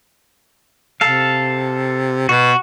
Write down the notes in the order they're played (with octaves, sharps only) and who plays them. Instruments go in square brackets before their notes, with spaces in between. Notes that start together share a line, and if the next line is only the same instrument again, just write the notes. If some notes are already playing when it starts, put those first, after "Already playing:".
[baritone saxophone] C3 [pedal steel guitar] A4 F5
[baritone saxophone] B2 [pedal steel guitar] F#4